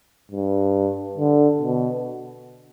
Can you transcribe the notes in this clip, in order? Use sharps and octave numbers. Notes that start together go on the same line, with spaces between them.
G2
D3
B2